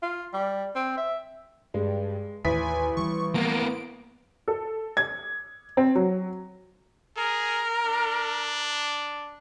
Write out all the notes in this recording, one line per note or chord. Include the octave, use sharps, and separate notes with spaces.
F4
G3
C4
E5
G2 G#3
A1 D#2 G#5 B6
E3 G3 C#6
A#3 B3 D7
A4
G#6
C4
F#3
G#4 A#4
D4